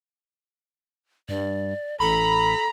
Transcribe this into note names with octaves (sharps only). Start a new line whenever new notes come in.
G2 D5
A1 A4 A#5 B5